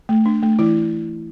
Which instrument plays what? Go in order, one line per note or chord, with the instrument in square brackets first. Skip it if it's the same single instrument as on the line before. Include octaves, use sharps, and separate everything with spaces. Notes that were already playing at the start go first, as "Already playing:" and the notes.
[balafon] A3
D4
A3
E3 E4